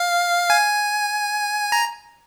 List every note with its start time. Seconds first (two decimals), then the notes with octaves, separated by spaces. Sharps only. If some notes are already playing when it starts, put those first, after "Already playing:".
Already playing: F5
0.50 G#5
1.72 A#5